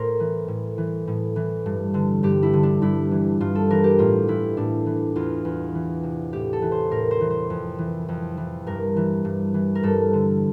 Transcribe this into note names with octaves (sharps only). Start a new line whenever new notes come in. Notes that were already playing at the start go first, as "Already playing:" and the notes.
Already playing: A2 A#4 C5
E3
A2
E3
A2
E3
G2
D3
G2 G4
E4
D3
D4
G2 E4
E3
G2 F4
A4
E3 A#4
G4
A2 F4
E3 E4
A2 D4
E3
E2 F4
E2
E3
C3
A2 G4
A4
E3
C5
A2 A#4
C5
E3
C5
F2
E3
F2
E3
G2 A#4
E3
G2
E3
A#4
G2 A4
D3